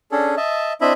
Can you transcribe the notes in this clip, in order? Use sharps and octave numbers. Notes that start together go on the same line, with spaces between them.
C#4 D4 G#4 A4
D#5 E5 A5
C4 D4 E4 D#5 E5 B5